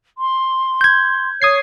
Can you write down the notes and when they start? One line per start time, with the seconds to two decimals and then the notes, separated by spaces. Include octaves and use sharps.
0.18 C6
0.81 G6 G#6
1.42 C#5 D#6 G#6 C7